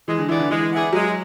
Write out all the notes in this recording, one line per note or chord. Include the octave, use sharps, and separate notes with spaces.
E3 G#3
D3
E3 B3 E4 G#4 D5
D3
E3 G#3
B3 E4 G#4 D5
F#3 G#3